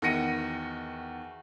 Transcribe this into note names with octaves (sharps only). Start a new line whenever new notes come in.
E2 D#3 F#4 A#6 C#7 D#7